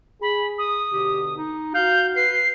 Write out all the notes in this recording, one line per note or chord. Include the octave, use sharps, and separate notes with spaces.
G#4 B5
D#6
B2 D3 G4
D#4
F#4 F5 G6
B4 C7